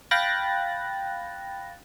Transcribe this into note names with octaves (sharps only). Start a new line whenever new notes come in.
F5 G5 B5 F#6 A6 A#6